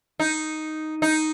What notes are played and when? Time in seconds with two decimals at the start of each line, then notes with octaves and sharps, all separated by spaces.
0.20 D#4
1.02 D#4